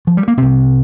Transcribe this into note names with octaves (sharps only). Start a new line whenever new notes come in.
F3
G3
A#3
C2 C3 C4